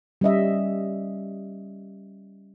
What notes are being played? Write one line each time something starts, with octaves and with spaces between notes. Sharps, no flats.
G3 C#4 D#5 E5